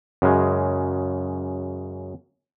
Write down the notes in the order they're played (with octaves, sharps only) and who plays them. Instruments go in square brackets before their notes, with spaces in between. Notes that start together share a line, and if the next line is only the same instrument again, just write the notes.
[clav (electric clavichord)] F#2 C#3 G#3